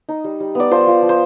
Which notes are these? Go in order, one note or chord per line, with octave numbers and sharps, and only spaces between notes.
D#4
G3
G3
B3 D5
F3 C5
F3
F3
C5